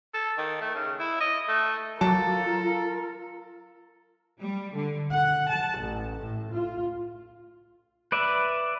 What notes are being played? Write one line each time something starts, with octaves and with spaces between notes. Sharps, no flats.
A4
D#3
A3
C#3
E4
D#5
A3
F#3 F4 F#4 A4 A#4 A5 D6
G3
D3
F#5
A5
A1
A2
F4
B4 D5 E5